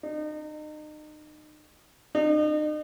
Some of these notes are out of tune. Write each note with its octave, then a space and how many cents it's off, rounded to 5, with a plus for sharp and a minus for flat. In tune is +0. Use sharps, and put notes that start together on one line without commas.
D#4 -35
D#4 -40